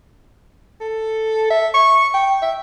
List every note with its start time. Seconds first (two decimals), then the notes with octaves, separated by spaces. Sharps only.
0.81 A4
1.50 E5
1.74 C#6
2.14 G5
2.42 E5